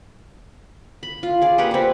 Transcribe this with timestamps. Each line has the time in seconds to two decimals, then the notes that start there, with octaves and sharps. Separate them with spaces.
1.03 B5
1.23 F4
1.42 G#4 D5
1.58 A#3 G4 B4 F#5
1.71 C4 B4